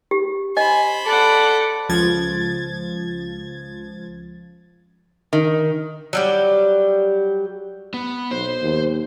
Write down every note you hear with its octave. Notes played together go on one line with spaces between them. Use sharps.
G4
C5 D#5 G#5 B5
A4 D5 F#5
C#2 F3 G#6 A6
D#3
F#3 G3 G4
B3
B1 C5
D#2